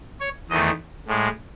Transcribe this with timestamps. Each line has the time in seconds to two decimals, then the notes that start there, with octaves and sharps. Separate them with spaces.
0.21 C#5
0.49 E2 D#3 A3 D#5
1.08 A2 G#3